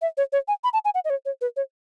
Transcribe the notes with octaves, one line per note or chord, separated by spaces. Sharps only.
E5
C#5
C#5
G#5
B5
A5
G#5
F#5
D#5
C#5
C#5
B4
C#5